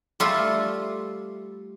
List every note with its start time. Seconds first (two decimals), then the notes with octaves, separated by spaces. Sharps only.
0.20 G3 A3 F4 A4